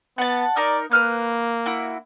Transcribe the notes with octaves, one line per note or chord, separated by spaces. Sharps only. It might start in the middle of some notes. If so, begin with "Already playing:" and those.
B3 F#5 A5
D#4 A#4 D5
A#3 B4 F6 F#6
E4 F#4